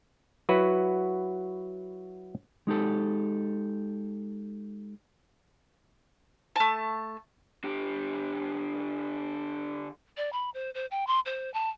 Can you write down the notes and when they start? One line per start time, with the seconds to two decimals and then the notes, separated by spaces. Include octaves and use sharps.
0.49 F#3 E4 F#4 B4
2.67 G#3 D#4 G4 A4
6.56 A3 A5
7.64 D3 G4
10.17 D5
10.33 B5
10.54 C5
10.75 C5
10.91 G5
11.07 C6
11.26 C5
11.54 A5